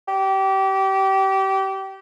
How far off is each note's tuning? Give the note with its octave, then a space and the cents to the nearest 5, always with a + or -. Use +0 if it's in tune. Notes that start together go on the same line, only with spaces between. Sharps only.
G4 -25